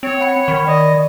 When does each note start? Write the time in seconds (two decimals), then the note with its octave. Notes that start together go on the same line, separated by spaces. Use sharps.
0.03 C4 C#5
0.21 F#5 B5 C#7
0.48 D#3 B5 C#6
0.67 D5 D#5